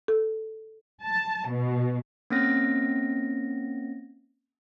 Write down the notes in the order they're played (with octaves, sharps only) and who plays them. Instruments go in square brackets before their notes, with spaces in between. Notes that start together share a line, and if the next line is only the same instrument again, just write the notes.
[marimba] A4
[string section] A5
B2
[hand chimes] A#3 C4 C#4 A#6